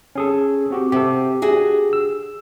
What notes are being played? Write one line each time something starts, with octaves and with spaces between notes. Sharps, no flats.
C#4 G#4 A4
C4 F#4 G4
C3 G4 A4
D4 F#4 G#4
E6